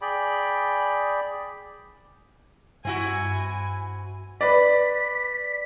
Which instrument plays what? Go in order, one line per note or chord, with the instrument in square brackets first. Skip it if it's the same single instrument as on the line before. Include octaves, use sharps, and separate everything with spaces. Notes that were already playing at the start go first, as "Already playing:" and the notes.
[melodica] G#4 D5 G5 B5
[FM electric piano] G2 [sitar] C4 E4 F#4 [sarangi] G#5
[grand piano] B4 D5 [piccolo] B6